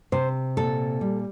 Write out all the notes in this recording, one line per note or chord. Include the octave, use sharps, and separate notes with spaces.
C3 C5
A#2 A4
G3